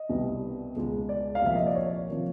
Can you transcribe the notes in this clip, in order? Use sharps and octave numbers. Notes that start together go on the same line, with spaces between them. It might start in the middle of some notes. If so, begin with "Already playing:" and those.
Already playing: D#5
C2 B2 G3 B3
C#2 B2 G#3
D5
F5
C2 A#2 F3 A#3 E5
D#5
D5
C#5
C3 F3 A#3